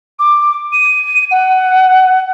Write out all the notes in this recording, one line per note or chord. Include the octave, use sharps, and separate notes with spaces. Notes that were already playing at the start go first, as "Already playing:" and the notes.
D6
D#7
F#5